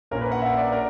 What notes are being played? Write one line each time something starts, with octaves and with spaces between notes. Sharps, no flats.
A#1 A#2 A#3 C#4 A#4
B4
F#5
E5
D5
A#4